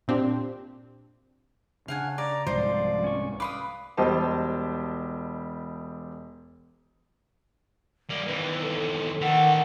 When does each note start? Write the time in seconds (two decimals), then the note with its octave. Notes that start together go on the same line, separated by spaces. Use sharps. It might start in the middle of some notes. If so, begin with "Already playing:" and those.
0.08 A#2 C4 D4 G4
1.88 C#3 D4 F5 F#5 G#5
2.18 D5 A#5
2.47 C2 G#2 F3 C5 D5 C6
3.04 C#4 C#6
3.40 B4 F5 C6 D6 D#6
3.97 E1 G3 G4 C5 D#5 A5
8.10 G3 A#3
8.27 D#2 E3 B4
8.62 A4
9.21 D#3 E3 A4 F#5